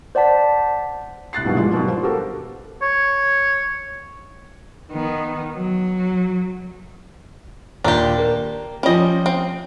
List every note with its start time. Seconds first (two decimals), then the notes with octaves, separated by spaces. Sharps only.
0.15 C5 D5 F#5 A5 B6
1.33 C2 F#6 A6 C7
1.45 G2 B2 D#3 E3 F#3 G3
1.57 G#2 E3 F3 G#3
1.73 B2 D#3 F#3 G3
1.88 F4 C5
2.03 B3 F#4 G4 A4 A#4
2.82 C#5
4.92 D#3 B3
5.54 F#3
7.84 D#2 A#2 D4 G4 A#5
8.18 A#3
8.83 F3 G3 C#4 D#5
9.26 C4